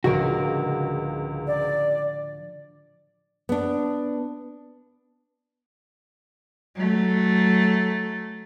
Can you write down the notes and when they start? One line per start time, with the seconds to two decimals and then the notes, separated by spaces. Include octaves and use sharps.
0.04 C#2 A2 D3 F3 F#4 A#4
1.47 D5
3.49 B3 D4
6.76 F#3 A3